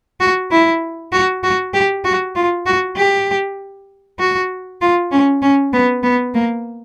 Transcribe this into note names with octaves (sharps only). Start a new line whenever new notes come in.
F#4
E4
F#4
F#4
G4
F#4
F4
F#4
G4
F#4
F4
C#4
C#4
B3
B3
A#3